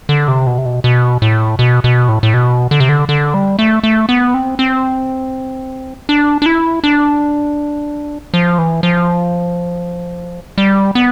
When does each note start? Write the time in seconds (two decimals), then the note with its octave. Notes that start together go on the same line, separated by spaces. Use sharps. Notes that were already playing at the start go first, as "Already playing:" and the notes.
0.09 D3
0.28 C3
0.47 B2
0.58 C3
0.65 B2
0.84 B2
1.22 A2
1.59 B2
1.84 B2
2.09 A2
2.23 A2
2.34 B2
2.71 D3
2.80 C3
2.89 D3
3.09 D3
3.34 G3
3.59 A3
3.84 A3
4.09 B3
4.34 C4
4.59 C4
6.09 D4
6.42 D4
6.46 E4
6.84 D4
8.34 F3
8.58 E3
8.83 F3
10.58 G3
10.95 B3